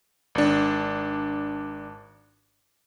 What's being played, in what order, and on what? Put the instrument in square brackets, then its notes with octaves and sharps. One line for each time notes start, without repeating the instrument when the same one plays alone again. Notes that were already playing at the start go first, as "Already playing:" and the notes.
[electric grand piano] G#1 D4